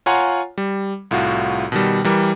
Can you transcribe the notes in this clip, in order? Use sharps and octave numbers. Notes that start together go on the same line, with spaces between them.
F4 C#5 F#5 G#5 A#5 C6
G3
C2 A2 F4 F#4
B2 D#3 G3
E3 G3 A#4